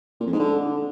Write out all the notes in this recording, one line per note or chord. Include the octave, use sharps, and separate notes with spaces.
A#2
F2
G#2
D3